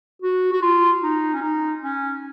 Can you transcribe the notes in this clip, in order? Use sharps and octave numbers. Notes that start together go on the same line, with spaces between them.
F#4
F#4
F4
D#4
C#4
D#4
C#4